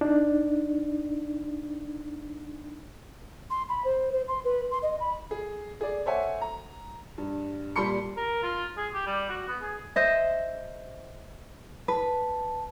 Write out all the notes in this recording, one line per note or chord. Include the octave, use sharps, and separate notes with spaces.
D4 D#4
C6
B5
C5
C5
C6
B4
C6
D#5
B5
G#4
G#4 D5
A4 C5 C#5 E5 F#5 G#5
A#5
G2
A#2 G3 A5 B5 C6 C#7
A#4
F4
G#4
G4
G3
F#4
B3
G#4
C5 D#5 E5
B4 A5